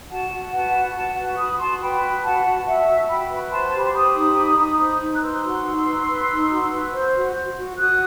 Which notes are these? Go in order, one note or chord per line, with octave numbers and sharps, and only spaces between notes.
F#4 F#5 A5
F#4
B4 F#5 A5
F#4
F#4 F#5 A5
B4
F#4 B5 D#6
F#4 A5 C6
B4 G5 B5
F#4
F#4 F#5 A5
F#4
F#4 E5
F#4
F#4 G5 B5
B4
C5 A5 C6
A5
G4 B5
C6
G4 B5 D#6
D#4
D#4
D#4
C5
D#4
F#6
B4 C6 E6
F#4
D#4
B4
B4
D#4
F#4
B4
C5
F#4
F#4
F#4
F#4 D#6 F#6